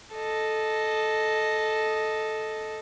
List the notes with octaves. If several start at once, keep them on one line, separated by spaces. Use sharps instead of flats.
A4 D#5